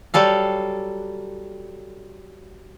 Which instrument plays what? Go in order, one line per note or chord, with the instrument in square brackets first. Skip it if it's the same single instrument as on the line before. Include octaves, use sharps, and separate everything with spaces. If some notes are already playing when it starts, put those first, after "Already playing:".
[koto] F#3 G3 A4 F5